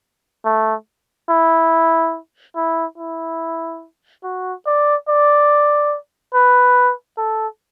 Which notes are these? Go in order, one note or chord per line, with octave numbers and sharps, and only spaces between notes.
A3
E4
E4
E4
F#4
D5
D5
B4
A4